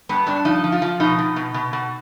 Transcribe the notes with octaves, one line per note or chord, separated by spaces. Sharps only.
G2 B3
G2 D4
F3 D#4
F3
F4
F3
B2 D#4
B2
B2
B2
B2